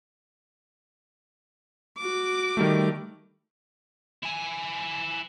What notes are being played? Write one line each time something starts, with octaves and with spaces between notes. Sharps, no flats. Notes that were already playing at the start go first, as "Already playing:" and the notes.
F#4 D6
D#3 G3 A3
E4 G#5